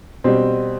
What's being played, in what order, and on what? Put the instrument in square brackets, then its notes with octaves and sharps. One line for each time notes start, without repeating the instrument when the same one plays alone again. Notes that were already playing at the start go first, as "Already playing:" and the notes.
[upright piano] B2 G3 C4